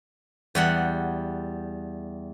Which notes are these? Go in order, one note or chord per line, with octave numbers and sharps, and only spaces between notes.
E2 G3 F#5